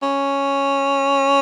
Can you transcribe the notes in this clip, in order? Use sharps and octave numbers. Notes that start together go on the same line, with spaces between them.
C#4